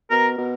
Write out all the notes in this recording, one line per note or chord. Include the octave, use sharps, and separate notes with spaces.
B2 A#4
B2